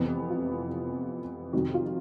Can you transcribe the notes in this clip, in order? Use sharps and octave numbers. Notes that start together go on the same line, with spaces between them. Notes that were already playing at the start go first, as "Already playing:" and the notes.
Already playing: F2 C3 E3 B3
F4
F2 C3 D#3 F#4
F4